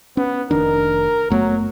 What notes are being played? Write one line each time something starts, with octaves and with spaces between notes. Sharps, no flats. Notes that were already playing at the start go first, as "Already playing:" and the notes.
B3 C#4
F1 D#3 D4 A#4
F#1 F#3 A3 B3